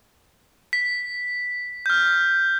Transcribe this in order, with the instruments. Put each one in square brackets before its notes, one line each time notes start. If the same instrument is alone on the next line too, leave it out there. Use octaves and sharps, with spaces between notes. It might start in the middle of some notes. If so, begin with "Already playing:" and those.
[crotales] B6
F6 G6